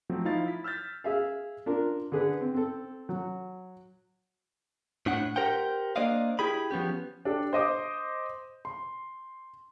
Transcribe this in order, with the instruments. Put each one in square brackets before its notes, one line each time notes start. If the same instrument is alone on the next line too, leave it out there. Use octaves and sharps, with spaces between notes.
[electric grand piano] F3 F#3 A3 C4
F3 D#4 E4 F5 A6
E4 B6
E6 F6 G6 A6 B6
[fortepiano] G#4 E5 F5
D4 F4 A#4
D3 G#4 B4
C4
C4 A4
F#3
[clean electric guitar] A2 D4 F#5
G4 A#4 C5 F#5 G5
A#3 D4 C5 D5 D#5 F5
E4 G4 G#4 B5
F3 B3 C#4 G4
[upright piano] D4 G4 A4
C5 D#5 D6 D#6
C6